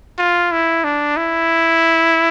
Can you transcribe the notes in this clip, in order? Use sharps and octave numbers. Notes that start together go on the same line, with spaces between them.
F4
E4
D4
E4